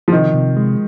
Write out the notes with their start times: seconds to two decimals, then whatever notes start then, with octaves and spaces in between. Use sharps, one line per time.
0.08 F3
0.11 C3 D#3
0.33 C3
0.56 G#3